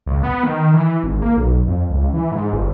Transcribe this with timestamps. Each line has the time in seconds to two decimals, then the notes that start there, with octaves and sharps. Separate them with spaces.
0.06 C#2
0.23 B3
0.43 D#3
0.74 E3
1.03 G#1
1.22 A#3
1.37 B1
1.67 F2
1.90 C#2
2.13 E3
2.32 G#2
2.53 G1